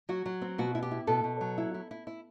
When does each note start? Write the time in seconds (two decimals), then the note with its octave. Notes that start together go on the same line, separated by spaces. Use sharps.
0.09 F#3 F#4
0.26 F#3
0.42 C4
0.58 B2 F#4
0.75 E4
0.83 G4
0.91 E4
1.07 B2 A4
1.24 B2
1.41 F#3
1.58 E4
1.74 E4
1.91 E4
2.07 E4